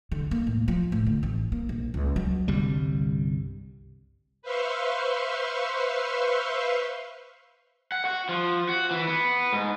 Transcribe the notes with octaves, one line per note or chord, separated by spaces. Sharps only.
D3
A#3
A2
F3
A2
D3
A1
A#3
A#1
C#2
F#3
G1 C2 G3
B4 C5 E5 F5 C6 C#6
F#5
F#4
F3
F#4
E3
B3
G#2